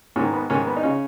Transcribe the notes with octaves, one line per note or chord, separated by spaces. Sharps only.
G#2 D#3 C#4
B3
G#2 D#3 C#4
B3
D#4
C#3 C#4